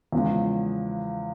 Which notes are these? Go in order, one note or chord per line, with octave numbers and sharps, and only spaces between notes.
E2 C#3 F3 G#3